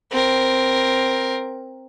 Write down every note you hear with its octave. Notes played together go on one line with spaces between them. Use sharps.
C4 A#4